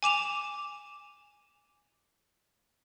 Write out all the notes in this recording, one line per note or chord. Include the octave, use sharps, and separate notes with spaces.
G#5 D6 E7 F7